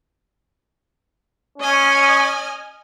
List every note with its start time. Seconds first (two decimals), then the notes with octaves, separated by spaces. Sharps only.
1.58 C#4 D#5 G#5 F6